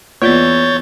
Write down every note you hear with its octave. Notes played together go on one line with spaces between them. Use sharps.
E2 E3 A#3 F4 C#5 D5 G6 A6